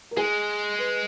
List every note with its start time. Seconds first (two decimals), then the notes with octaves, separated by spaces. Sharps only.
0.11 A#4
0.17 G#3 G#4
0.78 B4